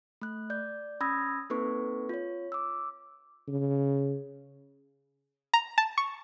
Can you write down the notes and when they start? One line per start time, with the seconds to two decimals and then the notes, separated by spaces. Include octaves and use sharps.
0.22 A3 F#6
0.50 D5 G6
1.01 C#4 B5 D#6 E6 G#6 A#6
1.50 A#3 C4 D#4 A4 B4 C#6
2.09 F4 C#5
2.52 D6 E6
3.48 C#3
5.54 A#5
5.78 A5
5.98 C#6